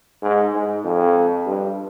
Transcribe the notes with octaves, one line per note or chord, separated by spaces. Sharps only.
G#2
G#2
F2
G2